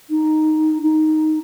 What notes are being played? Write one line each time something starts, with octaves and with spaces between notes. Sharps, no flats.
D#4
D#4